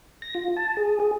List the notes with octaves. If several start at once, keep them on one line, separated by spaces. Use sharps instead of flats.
A#6
F4
A5
G#4
G#4